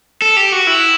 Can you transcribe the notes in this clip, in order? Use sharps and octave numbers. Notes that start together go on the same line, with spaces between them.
A4
G4
F#4
E4